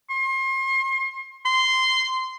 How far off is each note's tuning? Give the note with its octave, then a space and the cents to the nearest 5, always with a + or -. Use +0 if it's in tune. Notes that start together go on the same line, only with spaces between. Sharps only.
C6 +35
C6 -10